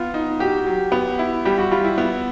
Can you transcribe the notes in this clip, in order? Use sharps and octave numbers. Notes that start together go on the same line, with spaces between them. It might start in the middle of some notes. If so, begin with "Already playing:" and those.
Already playing: B3 F4
D#4
F#4 G4
F#3
B3
E4
G3 G4
F#4
G3 F4
E4
B3